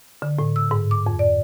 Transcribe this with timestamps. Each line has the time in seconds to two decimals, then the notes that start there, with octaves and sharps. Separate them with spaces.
0.22 D3
0.39 A2
0.56 E6
0.71 G#2
0.91 D6
1.06 F2
1.19 D5